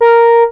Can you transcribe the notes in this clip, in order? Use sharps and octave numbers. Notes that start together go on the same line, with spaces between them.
A#4